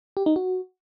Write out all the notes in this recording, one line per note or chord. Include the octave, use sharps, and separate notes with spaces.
G4
D#4
F#4